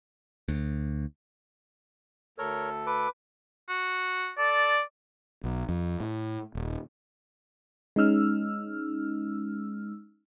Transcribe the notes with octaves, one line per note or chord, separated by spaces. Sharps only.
D2
D2 A4 A#4 C#5
B4 D6
F#4
A4 D5
B1
F2
A2
D#1
G#3 C#4 D#4 E6 F6